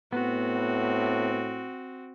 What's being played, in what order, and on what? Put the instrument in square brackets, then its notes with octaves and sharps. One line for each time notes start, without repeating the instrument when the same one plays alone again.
[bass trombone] A2 [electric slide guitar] B3 [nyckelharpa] C4 F#4